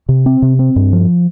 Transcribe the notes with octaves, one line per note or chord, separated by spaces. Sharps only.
C3
C4
C3
C4
G2
F3